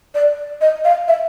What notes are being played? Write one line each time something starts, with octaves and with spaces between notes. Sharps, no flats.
D5
D#5
F5
E5